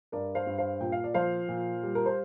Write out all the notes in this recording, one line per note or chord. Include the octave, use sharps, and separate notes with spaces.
G2 A#4 D5
C5 F5
G2
C5 F5
A#2 G5
F5
D5
F3 C5 F5
A#2
G3
A#4
C5